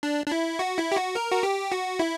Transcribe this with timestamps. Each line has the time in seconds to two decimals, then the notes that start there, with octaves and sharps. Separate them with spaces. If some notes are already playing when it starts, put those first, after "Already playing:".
0.03 D4
0.26 D4
0.32 E4
0.59 F#4
0.78 E4
0.92 G4
0.96 F#4
1.15 A#4
1.32 F#4
1.43 G4
1.72 F#4
1.99 E4